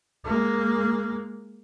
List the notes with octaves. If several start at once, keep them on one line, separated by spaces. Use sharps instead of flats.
G#3 A#3